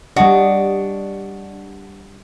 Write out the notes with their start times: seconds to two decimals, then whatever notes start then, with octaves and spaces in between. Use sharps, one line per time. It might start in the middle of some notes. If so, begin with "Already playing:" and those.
0.16 G3 D4 F#4 D#5